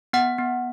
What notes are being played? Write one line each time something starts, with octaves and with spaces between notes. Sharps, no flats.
B3 F#5
B3